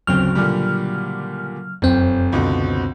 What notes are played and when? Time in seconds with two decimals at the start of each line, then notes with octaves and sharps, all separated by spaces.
0.07 D1 G1 C#3 F#3 C4 F6
0.35 A#2 D3 G3
1.82 F1 F#2 C4
2.33 C#2 B2 D3